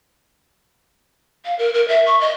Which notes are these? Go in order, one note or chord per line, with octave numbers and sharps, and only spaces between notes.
F5
A#4
A#4
E5
C#6
D#5